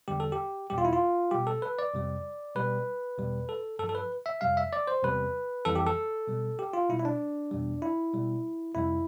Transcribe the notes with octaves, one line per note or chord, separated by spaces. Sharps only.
E2 D3 G3 G4
A4
G4
E2 B2 G3 G4
F4
E4
F4
B2 G3 G4
A4
B4
D5
F2 C3 G3
B2 G3 B4
E2 B2 G3
A4
G2 F3 A4
A4
B4
E5
F2 C3 G3 F5
E5
D5
C5
E2 C3 G3 B4
F2 E3 G3 A4
G4
A4
B2 G3
G4
F4
B2 G3 E4
E4
D4
E2 B2 G3
E4
B2 G3
F2 C3 G3 E4